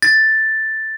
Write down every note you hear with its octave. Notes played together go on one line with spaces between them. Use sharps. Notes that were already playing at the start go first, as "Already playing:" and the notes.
A6